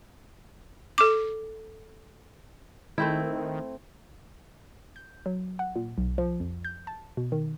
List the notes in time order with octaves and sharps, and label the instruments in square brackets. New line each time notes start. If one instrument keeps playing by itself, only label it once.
[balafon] A4 D6
[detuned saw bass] D#3 [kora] A3 C4 E4
[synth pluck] G6
F#3
F#5
A#2
B1
F3
F2
G6
A5
B2
D#3